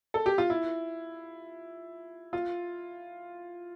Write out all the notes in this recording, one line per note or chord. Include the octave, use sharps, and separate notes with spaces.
A4
G4
F4
E4
F4